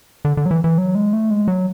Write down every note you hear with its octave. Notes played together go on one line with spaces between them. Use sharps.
D3
D3
F#3
E3
E3
F#3
G#3
A3
G#3
F#3